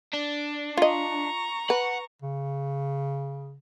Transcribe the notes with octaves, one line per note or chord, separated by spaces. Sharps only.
D4
F4 D#5 A#5 C#6
B4 F#5
C#3